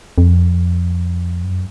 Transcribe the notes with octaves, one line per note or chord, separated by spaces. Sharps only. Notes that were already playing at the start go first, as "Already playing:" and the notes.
F2
F#2